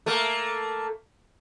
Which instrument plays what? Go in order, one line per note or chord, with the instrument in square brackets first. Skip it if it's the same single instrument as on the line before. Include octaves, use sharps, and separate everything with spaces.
[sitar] A3 A#3